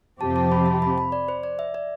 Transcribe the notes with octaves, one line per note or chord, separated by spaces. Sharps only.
F2 C3 F3 C4 G4 A5
A5
B5
A5
B5
B5
D5
C5
D5
E5
D5